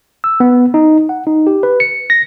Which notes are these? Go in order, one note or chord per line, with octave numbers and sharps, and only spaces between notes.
E6
B3
D#4
F#5
D#4
G4
B4
C#7
A#6